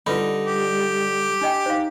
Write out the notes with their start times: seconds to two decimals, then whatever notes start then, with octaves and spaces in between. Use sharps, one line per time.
0.06 D3 G3 D#4 F4 B4 B5
0.47 G4
1.41 D4 D#5 G5
1.66 D#4 C5 F5